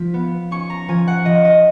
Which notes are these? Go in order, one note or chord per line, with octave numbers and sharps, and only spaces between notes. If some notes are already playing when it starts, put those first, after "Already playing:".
Already playing: F3 B6
B3
C#4 C#6
A#5
F3 G#5
F#5
F3 D#5
D#5